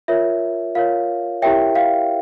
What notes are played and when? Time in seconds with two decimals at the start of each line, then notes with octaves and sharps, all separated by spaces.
0.08 F4 A#4 C#5 E5
0.75 F4 A#4 C#5 F5
1.42 E4 G4 A#4 C#5 E5 G5
1.75 F5